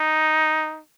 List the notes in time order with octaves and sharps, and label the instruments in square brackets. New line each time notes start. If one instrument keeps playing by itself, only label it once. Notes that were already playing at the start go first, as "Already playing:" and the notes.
Already playing: [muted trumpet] D#4